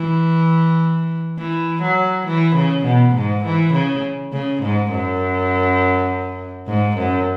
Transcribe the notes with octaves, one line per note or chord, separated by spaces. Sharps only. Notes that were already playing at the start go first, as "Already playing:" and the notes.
Already playing: E3
E3
F#3
E3
C#3
B2
G#2
E3
C#3
C#3
G#2
F#2
G#2
F#2